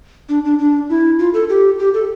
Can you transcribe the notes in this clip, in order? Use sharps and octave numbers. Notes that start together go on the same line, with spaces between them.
D4
D4
D4
E4
F4
A4
G4
G4
A4